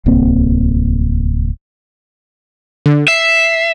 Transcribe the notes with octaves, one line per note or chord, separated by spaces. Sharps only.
D1 C2 A#3 C4
D3
E5 C7